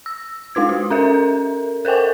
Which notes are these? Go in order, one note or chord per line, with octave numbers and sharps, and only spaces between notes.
E6
G#3 D#4 F4 G#6
F#4
C#4 A4 A#4 E5
A4 A#4 C5 G5 G#5